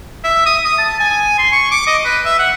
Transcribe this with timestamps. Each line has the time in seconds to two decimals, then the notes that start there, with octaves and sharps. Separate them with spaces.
0.24 E5
0.46 D#6
0.65 D#6
0.78 A5
1.00 G#5
1.38 C6
1.52 C#6
1.71 D6
1.87 D#5
2.05 B4
2.25 E5
2.39 F#5